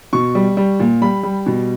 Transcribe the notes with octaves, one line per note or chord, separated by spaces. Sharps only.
B2 C#6
G3
G3
A#2
G3 B5
G3
B2